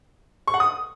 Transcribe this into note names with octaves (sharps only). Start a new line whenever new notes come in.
C#6
F#5
D#6